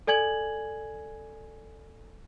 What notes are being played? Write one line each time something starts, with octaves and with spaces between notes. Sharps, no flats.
A4 D5 G#5 G#6 F#7